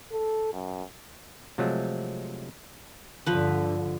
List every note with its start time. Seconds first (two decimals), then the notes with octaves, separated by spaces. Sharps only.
0.13 A4
0.53 F#2
1.58 C3 F3 F#3 G#3 A3
3.26 G2 D3 F3 B4